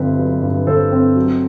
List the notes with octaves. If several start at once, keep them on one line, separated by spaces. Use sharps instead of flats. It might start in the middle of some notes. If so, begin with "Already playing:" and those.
Already playing: G1 G2 C4 B4
F#3
G2
G1 A4 C5
C4
F#3